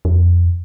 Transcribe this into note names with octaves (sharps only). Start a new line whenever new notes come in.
F2